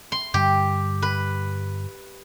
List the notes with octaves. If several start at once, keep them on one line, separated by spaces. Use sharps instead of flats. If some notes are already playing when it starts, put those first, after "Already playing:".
C6
G2 D3 G3 G4
B4